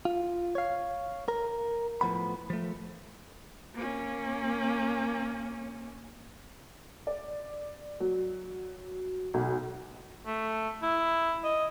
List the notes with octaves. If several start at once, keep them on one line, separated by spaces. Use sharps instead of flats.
F4
C#5 F5
A#4
A2 F3 B3 B5
F3 A3
A#3 C#4
D5
F#3
B1
A3
E4
D#5